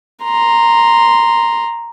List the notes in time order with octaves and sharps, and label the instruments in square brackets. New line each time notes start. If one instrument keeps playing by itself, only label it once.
[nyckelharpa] A#5 C6